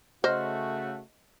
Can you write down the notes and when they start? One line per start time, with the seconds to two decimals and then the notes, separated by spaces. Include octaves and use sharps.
0.24 C#3 A3 F#4 C5 D#5 F6 A#6